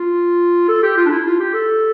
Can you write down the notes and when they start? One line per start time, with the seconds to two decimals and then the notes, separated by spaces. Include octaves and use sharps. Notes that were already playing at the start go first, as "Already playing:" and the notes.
Already playing: F4
0.68 A4
0.83 G4
0.97 F4
1.06 D4
1.11 E4
1.25 F4
1.40 G4
1.53 A4